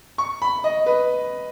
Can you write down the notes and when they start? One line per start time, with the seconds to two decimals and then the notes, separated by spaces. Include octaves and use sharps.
0.18 C#6
0.42 B5
0.64 D#5
0.86 B4